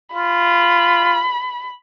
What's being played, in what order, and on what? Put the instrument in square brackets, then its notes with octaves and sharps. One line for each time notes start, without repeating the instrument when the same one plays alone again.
[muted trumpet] F4 [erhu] B5